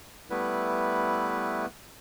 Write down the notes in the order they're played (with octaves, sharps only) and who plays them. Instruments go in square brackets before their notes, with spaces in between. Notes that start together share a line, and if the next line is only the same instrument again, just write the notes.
[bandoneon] G3 A3 B3 E4 B4